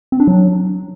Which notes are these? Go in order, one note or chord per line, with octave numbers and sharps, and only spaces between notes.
C4
D4
F#3